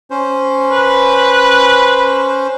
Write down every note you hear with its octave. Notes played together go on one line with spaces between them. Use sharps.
C#4 C5
B4